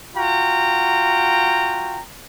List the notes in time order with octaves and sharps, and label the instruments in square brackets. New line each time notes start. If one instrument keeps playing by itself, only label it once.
[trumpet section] F4 F#4 G5 A#5